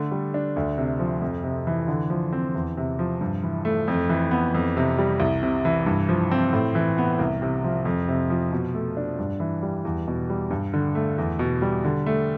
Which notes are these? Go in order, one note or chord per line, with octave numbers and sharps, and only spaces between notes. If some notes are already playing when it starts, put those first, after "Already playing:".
Already playing: D3 A3
G3
D4
D2
C3
F3
F2
C3
E3
D3
F3
C4
E2
C3
F3
G2
E3
A3
F2
E3
B3
F2
C3
G3
C2
C3
E3
G2
F3
C4
A2
E3
B3
C2
C3
F3
F2
C3
F3
B2
A3
D4
G2
E3
G3
E2
B2
G3
G2
D3
A3
E2
B2
G3
D3
A3